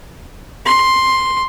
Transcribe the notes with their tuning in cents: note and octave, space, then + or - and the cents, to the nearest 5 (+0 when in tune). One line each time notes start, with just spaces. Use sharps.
C6 +5